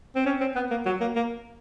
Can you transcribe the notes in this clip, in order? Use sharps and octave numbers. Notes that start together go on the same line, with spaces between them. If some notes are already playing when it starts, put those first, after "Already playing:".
C4
C#4
C4
B3
A#3
F#3
A#3
A#3